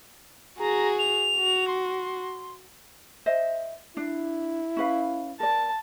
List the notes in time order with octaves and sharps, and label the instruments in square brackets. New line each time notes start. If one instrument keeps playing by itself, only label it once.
[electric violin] F#4 G#4 [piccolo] A#5
[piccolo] F7
[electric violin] F#4
[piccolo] C6
[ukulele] C5 D#5 E5
[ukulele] D4 [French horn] E4
[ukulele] C#4 B4 F5
[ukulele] A#4 D5 [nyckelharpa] A5